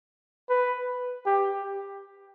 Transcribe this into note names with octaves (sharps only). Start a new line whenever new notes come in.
B4
G4